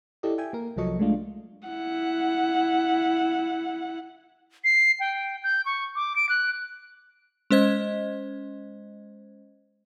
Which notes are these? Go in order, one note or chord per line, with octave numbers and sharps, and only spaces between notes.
E4 G4 A4 D5 D#5
E5 G5 G#5
A#3 A#4
C2 F3 F#3 A4 D#5 C#6
G#3 A3 D4 F4
E4 F#5
C7
G5
G6
C#6
D6
D7
F#6
G#3 C#4 C5 D#5 G#6